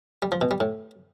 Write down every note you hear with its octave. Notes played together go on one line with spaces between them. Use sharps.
G3
F3
B2
G3
A2